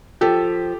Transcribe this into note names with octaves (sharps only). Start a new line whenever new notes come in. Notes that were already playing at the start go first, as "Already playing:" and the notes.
F3 G4 A4